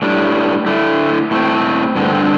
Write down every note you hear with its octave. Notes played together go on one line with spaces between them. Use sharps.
A2 G3 D4
D3 A3 E4
A2 A3 C4
G2 D3 C4